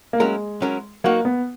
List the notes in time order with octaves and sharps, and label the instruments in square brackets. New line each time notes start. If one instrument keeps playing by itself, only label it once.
[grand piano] A#3
[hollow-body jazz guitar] F#3 C#4 E4 A#4 [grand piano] G#3
[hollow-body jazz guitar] F#3 C#4 E4 A#4
[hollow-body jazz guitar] F#3 B3 D#4 F#4 A#4 [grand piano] A#3
[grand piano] B3